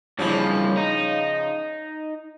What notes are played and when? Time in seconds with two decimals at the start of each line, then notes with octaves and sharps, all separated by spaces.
0.19 G2 C#3 E3 F3 C#4
0.77 D#4